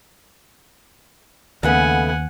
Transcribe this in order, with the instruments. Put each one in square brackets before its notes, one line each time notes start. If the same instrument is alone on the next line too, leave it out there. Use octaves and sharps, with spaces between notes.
[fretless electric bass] D#2 [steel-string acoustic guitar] C#3 A3 B3 [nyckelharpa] F#5 G#5